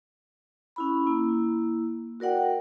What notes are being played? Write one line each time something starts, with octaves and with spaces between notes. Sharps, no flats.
C#4 E4 B5
A#3 E4
F#4 A#4 D5 F#5 G5